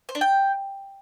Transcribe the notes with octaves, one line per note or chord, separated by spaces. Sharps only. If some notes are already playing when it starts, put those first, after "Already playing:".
C5
D4
G5